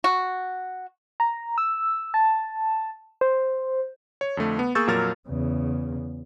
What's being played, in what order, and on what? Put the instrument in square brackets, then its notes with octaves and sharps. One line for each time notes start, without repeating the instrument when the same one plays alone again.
[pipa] F#4
[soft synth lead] A#5
E6
A5
C5
[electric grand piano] C#5
F2 D3 A3
B3
A#3 G#4 C#6 E6 G6 A6
F2 A#2 F#3 A#4 F6 A6
[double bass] E2 C#3